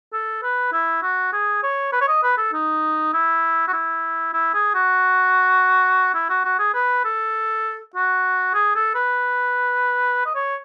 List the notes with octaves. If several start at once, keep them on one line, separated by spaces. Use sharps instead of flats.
A4
B4
E4
F#4
G#4
C#5
B4
C#5
D#5
B4
A4
D#4
E4
F#4
E4
E4
G#4
F#4
E4
F#4
F#4
G#4
B4
A4
F#4
G#4
A4
B4
D#5
C#5